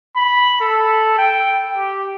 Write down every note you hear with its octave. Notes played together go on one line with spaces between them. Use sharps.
B5
A4
G5
G4